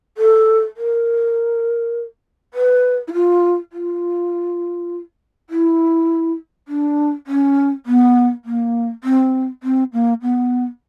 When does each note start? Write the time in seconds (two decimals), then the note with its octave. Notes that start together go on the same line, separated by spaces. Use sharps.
0.18 A4
0.77 A#4
2.54 B4
3.08 E4
3.13 F4
3.73 F4
5.50 E4
6.68 D4
7.27 C#4
7.86 B3
8.45 A#3
9.04 C4
9.63 C4
9.93 A#3
10.22 B3